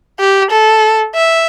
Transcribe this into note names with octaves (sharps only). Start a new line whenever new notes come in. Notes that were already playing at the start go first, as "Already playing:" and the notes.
G4
A4
E5